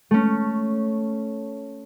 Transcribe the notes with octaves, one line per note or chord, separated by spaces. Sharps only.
A3 C#4